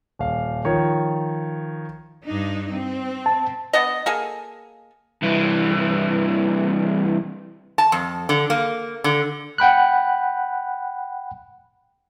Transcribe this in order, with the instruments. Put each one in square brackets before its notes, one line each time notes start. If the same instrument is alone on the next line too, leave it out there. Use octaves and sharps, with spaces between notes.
[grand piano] D#1 F5
D#3 F3 C#5
[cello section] G2 D4 D#4
C4
[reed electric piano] A5
[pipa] B3 D4 D#5
A#3 G#4 A4
[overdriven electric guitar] C2 E3
[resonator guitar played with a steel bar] A5
F2
D3
A#3
D3
[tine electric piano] F#5 G5 B5 F#6